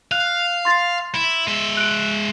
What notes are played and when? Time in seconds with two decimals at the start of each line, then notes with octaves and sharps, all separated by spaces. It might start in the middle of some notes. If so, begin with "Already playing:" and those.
0.12 F5 F#6
0.65 C6 A6
1.15 E4
1.48 G#3 E5
1.77 F#6 D7